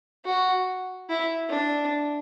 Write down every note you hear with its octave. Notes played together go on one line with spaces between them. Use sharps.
F#4
E4
D4